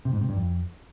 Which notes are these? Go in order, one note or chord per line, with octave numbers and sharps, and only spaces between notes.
C3
G#2
C3
G2
F2